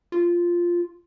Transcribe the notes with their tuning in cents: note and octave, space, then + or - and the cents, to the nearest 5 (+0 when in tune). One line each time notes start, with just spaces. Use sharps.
F4 -5